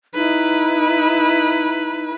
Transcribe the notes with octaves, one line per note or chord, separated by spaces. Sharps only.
D#4 E4 B4